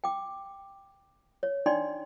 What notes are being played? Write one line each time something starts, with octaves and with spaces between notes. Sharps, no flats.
G5 D6
C#5
D4 D#4 D5 G5 C6